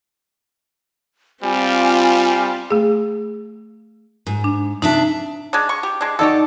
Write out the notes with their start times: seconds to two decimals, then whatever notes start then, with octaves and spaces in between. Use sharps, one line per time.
1.43 G3 C4 F4 G#5
2.71 A3 G#4
4.27 G#2
4.44 D4
4.82 C3 D4 D#4 E5 A5
5.53 G#3 D4
5.69 C#6
5.83 G4
6.01 G#3 D4
6.19 D#4 F#4 G4 A4 D5 A6